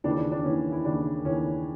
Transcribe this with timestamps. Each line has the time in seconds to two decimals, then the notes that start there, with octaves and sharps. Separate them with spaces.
0.04 D#2 C#3 E3 D4
0.17 D4
0.31 D4
0.44 D#2 C#3 E3 C#4
0.72 E4
0.85 D#2 C#3 E3 D4
1.25 D#2 C#3 E3 C#4